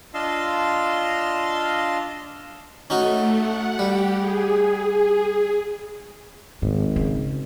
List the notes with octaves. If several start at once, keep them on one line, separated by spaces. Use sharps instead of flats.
D4 F4 D#5 F5 C6 E6
A3 C#4 D#4 F#4
F#5
G3 G4
G#4
G#1 G#2
C#3